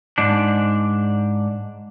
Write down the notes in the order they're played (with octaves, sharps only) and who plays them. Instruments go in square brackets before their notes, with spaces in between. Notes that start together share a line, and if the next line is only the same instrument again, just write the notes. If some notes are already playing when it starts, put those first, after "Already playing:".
[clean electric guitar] G#2 D4